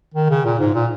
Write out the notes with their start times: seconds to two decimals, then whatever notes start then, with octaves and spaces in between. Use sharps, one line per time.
0.14 D#3
0.30 C#3
0.45 A#2
0.59 G#2
0.75 A#2